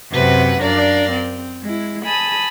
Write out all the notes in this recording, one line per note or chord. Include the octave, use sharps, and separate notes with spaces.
F#2 C3 C4 B4 F#5
F#2 D4 A#4 D5 F5
C4
G#3 E4
G#5 A5 B5 D#6